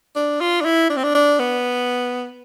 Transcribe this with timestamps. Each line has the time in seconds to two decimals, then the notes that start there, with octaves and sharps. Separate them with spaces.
0.16 D4
0.41 F4
0.61 D4
0.65 E4
0.90 D4
0.97 C4
1.04 D4
1.15 D4
1.39 B3